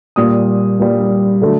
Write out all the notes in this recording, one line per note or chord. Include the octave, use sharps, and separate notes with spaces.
A#2 G3 D#6
A#2 G3
D3 F#3 A3